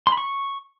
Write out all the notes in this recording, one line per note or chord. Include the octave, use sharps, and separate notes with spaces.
C6
B5
C#6